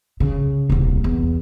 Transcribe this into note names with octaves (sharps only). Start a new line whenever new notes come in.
C#3
D#1 C2
E2